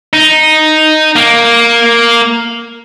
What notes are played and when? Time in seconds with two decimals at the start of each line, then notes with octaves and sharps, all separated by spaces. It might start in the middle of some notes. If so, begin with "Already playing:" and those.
0.13 D#4
1.16 A#3